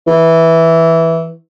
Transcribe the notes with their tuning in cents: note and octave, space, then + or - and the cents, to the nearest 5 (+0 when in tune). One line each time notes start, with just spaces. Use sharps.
E3 -5